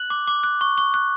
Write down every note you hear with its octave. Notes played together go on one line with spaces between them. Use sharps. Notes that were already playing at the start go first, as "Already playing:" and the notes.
Already playing: F#6 F#7
D6
D6
F#6
C#6
C#6
F#6